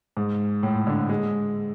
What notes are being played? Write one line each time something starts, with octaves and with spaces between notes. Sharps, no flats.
G#2
A2
D3
G#3